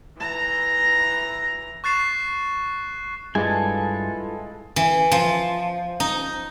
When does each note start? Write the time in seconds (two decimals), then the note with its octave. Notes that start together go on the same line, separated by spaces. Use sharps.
0.19 E3 A#5
1.84 C#6 F#6 A6 C7 E7
3.35 G2 G#3 E4 F4 A4 B4 G#5
4.76 E3
5.12 F3
6.00 D#4